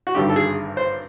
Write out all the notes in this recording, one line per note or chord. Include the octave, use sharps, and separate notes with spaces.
F#4
G#1 G2 D3 G3 G4
A4
G#4
C5